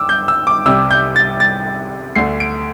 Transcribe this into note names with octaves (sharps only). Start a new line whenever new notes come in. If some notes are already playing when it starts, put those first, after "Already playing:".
Already playing: G2 D6 E6
G6
E6
D6
C2 C3 G3 E6
G6
A6
A6
D2 D3 A3 C7
D7